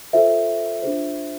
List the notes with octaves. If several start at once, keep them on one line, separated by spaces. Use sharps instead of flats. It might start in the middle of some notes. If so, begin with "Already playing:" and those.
F4 A4 C5 E5
D4 F4 G#4 C5